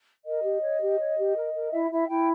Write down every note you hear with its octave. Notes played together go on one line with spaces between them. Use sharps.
A#4 D#5
G4
C#5
G4
C#5
G4
A#4
A#4
E4 E5
E4 E5
E4 G5